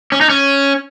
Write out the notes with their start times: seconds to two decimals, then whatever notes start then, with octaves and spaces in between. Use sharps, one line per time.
0.12 C#4
0.21 D#4
0.29 C#4